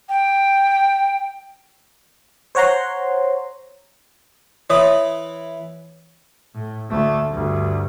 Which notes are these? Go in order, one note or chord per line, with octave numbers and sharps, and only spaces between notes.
G5
C5 C#5 F#5 A#5 C6
E3 B4 C#5 C6 D#6
A2
D2 A3
D2 G2